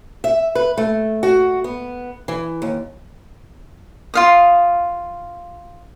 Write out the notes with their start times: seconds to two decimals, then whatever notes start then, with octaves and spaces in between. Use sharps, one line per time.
0.24 E5
0.55 B4
0.78 A3
1.23 F#4
1.64 B3
2.28 E3
2.62 D#2
4.14 F4 F5 D#6